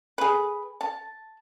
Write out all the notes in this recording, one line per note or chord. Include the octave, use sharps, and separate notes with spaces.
G#4 B4
A5